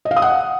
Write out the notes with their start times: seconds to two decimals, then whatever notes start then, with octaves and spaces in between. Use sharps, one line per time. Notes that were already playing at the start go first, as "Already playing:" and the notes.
0.05 D#5
0.11 F5
0.17 D#6
0.22 F#5